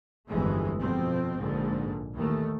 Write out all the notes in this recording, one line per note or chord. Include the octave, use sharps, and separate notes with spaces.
G1 F2 E3 G#3 A3
F2 B2 F3 C4
A#1 G#2 D3
D#2 D#3 E3 A3